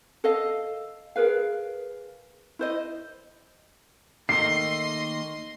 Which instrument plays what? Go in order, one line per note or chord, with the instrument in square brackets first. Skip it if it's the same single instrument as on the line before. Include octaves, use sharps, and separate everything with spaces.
[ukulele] A4 D#5 F5
G#4 A#4 B4 F5
E4 C5 D#5
[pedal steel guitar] D#3 A3 A#3 [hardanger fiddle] D#5 C6 [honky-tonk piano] C7